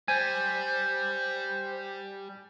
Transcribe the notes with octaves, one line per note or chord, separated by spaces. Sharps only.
G3 C5 G#5